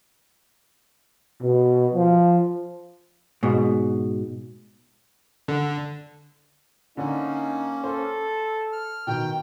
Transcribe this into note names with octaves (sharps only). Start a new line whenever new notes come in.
B2
F3
G#2 B2
D3
D3 A#3 C#4 D#4
A4 C5
F6
B2 D#3 G5